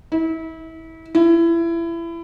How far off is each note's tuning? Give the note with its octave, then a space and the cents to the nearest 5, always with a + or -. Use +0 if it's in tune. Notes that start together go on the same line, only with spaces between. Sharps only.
E4 -30
E4 +25